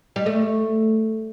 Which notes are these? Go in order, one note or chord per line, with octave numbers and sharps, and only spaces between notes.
G3
A3